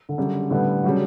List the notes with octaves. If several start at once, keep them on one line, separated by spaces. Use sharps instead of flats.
D3
F#2 C#3 G3
A2 D3 G3 B3
C#3 F#3 G3 D4 F#4